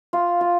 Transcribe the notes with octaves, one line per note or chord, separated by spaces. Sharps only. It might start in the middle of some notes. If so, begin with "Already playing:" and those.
F4
F4